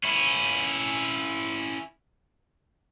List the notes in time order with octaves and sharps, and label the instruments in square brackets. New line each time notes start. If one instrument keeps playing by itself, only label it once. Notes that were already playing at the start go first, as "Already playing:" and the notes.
[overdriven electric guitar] C#4 E4